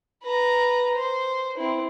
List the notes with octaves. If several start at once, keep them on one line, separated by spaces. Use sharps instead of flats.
B4 A#5
C5
C4 E4